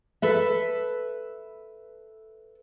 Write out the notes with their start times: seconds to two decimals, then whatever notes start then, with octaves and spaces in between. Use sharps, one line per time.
0.22 A4 B4 E5